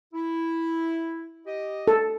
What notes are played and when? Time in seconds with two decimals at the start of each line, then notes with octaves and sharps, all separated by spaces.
0.14 E4
1.46 G4 D#5
1.88 A4